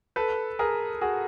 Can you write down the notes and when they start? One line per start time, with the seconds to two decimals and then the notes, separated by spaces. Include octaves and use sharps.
0.16 A4 B4
0.59 G#4 A#4
1.01 F#4 G#4